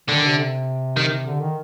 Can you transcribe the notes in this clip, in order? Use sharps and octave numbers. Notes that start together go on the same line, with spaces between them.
D3 D#3
C3
C3 D#3
D3
D#3